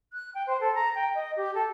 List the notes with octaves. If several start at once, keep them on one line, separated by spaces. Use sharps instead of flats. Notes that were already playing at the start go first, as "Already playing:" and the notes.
F#6
G5
C5
A4
A#5
G5
D#5
G4
A4